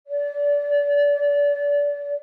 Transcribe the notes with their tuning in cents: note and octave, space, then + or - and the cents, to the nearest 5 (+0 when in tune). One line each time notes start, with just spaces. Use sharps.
D5 -25